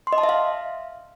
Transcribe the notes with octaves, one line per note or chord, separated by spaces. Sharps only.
C6
D#5
A5
E5
F5